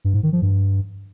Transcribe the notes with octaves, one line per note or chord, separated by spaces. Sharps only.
G2
G#2
D#3
F3
G2